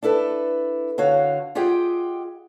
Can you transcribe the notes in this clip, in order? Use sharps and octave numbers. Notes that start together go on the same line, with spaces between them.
D4 E4 A4 B4
D3 F#4 C#5 F5
F4 G4 G#4 D#5 F#5 G5